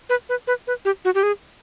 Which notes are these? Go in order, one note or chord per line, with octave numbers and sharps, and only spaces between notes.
B4
B4
B4
B4
G4
F#4
G4
G#4